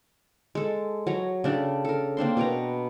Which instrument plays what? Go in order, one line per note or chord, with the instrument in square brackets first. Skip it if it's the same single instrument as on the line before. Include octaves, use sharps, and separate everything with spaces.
[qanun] G#3 A4
F#3 C#5 A#5
C#3 D4 G4 A4
A4 A#4
A#3 C4 D4 C6
B2 B4 G5 A#5